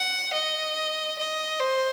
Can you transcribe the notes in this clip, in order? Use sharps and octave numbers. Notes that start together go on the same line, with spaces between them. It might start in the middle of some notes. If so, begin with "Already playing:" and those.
Already playing: F#5
D#5
D#5
C5